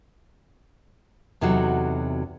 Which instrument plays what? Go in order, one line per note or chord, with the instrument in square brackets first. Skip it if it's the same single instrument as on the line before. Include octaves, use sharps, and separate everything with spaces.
[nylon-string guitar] E2 C3 F#3 D#4 F#4 A4